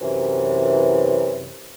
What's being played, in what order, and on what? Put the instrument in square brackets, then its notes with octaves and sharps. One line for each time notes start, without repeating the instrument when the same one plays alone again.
[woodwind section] F#2 C3 E3